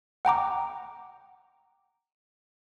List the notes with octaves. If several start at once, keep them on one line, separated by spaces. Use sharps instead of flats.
F#5 G5 A#5 D6